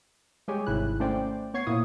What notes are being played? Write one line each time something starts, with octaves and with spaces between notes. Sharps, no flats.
G3 G#3 G4 G#4 C#5 G#5
G#1 G#2 C3 E4 F#6
A3 C#4 C5 D5 G5
B3 C#5 C#6 G#6 C7
A#2 A#3 E4 D#6